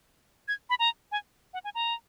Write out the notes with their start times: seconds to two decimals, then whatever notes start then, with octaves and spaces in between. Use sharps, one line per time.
0.48 G#6
0.70 B5
0.79 A#5
1.12 G#5
1.54 F#5
1.64 G#5
1.75 A#5